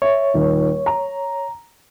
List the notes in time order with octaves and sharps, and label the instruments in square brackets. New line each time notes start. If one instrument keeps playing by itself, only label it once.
[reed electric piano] C#5 [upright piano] E5
[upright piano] D#1 D#3
A#5